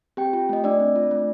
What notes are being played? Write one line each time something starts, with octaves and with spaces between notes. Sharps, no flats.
C4 G4 G5
F4
A3 D#5
A3 D4 D5
C4
F4
A3